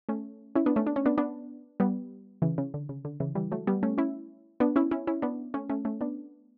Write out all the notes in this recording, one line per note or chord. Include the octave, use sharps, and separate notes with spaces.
A3 C#4
C#4 E4
B3 D4
A3 C#4
D4
C#4
B3 D4
B3 D4
G3 B3
C#3 E3
C#3
D3
C#3
D3
C#3 E3
E3 G3
F#3 A3
G3 B3
A3 C#4
C#4 E4
B3 D4
C#4 E4
C#4 E4
C#4 E4
B3 D4
A3 C#4
A3 C#4
A3 C#4
B3 D4